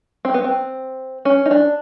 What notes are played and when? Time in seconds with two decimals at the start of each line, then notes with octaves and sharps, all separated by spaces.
0.25 C4
0.34 B3
0.44 C4
1.25 C#4
1.46 D#4
1.51 D4